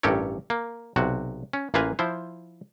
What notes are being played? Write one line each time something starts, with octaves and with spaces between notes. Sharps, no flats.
A1 G2 G4 A4 A#4 C#5
A#3
B1 C3 F#4
C#4
A1 A#3 F4 B4 G#5 A#5
F3 E4 C5